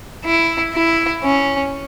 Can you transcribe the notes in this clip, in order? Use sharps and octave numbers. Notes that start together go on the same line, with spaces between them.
E4
E4
C#4